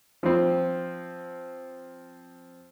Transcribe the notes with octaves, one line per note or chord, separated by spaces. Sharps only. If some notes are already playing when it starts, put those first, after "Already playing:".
F3 C4